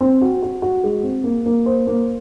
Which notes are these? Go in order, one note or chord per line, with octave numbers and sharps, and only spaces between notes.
C4
F#4
F#4
F#4
G#3
C4
A#3
A#3
C5
A#3